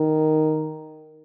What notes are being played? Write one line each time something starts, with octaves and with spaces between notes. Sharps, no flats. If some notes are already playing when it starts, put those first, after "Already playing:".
Already playing: D#3